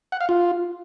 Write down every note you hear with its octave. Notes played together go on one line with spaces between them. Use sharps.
F#5
F5
F4